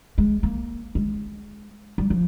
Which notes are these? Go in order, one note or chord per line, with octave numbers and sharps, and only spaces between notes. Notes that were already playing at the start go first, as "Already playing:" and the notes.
G#3
A#3
G#3
G3
F3